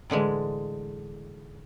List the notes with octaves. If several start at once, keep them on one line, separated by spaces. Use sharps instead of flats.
A2 D3 E3 G#3